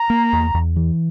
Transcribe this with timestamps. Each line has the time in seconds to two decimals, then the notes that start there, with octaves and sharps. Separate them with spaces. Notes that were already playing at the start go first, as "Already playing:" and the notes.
Already playing: A#5
0.10 A#3
0.33 E2
0.54 E2
0.76 E3